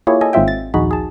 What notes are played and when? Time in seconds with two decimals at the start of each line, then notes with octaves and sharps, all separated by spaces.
0.07 A#3 E4 F4 G4 G#4 C#5
0.21 A4 D#5 G#5
0.33 G#1 G#2 C4 F4 E5 G5
0.48 A6
0.74 A#1 D#2 D#4 F#4 G#4 B5
0.91 G#4 A5